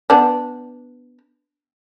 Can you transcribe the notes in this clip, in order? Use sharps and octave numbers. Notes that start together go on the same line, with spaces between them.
B3 D4